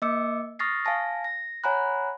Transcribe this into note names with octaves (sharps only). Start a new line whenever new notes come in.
A#3 D#5 D6 E6 C#7
C#6 D#6 F6 A6 A#6 C7
F5 G#5 A5 A#6
A#6
C#5 F#5 G#5 A#5 B5 F#6